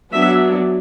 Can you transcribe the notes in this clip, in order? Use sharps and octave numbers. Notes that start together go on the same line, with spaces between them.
F#3 B3 D4 E5